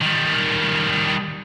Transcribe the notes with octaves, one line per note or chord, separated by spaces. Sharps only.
D#3 G3